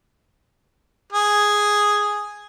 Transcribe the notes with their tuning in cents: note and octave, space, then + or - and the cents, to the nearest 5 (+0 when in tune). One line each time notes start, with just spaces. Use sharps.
G#4 +0